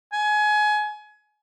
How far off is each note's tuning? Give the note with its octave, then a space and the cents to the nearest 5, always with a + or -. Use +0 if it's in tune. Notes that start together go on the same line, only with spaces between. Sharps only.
G#5 +25